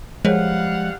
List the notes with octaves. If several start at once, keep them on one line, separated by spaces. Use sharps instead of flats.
F3 G3 G#3 G#4 A#4 C#5 F5 F#5